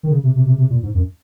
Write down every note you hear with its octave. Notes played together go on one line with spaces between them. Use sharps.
D#3
C#3
C3
C3
C3
C3
A#2
G#2
F#2